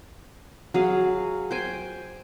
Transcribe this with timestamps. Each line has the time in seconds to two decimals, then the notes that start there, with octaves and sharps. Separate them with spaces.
0.74 F#3 G#4 F5
1.51 C5 G5 G#5